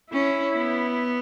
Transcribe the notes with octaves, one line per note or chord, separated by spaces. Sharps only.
C#4 E4
B3